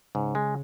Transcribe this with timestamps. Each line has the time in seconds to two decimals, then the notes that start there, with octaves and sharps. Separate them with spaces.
0.15 G#2 C#3
0.35 G#3